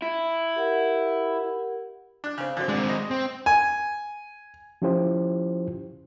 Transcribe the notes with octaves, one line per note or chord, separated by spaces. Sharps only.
E4
G4 A#4 F#5
D4 F#6
C#3 C4
D3 F#3 C4
G#3 C4 D4
D#5
C4
G#5
F3 C#4 E4 F4 G4 C5